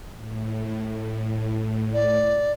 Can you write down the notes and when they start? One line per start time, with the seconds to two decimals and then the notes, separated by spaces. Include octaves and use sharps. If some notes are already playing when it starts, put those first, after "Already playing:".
0.15 A2
1.94 D5